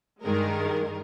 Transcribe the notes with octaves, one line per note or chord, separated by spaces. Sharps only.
G2 D#3 G#3 A#4